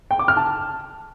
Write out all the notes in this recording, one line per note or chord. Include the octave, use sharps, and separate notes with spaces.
G5
D6
F6
A5